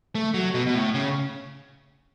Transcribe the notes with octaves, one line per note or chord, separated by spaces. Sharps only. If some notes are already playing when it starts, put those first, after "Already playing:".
A3
F#3
B2
B2
A2
C#3